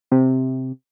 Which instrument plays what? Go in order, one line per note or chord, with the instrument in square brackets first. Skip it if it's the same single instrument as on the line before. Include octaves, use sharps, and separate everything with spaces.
[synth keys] C3